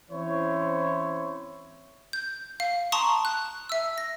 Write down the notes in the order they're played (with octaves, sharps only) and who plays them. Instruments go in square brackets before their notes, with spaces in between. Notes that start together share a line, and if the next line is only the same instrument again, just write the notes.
[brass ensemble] E3 C4 C#4 E4 C5 C#5
[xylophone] G6
F5
A5 A#5 C6 C#6 D#6
F#6
E5 E6
A#6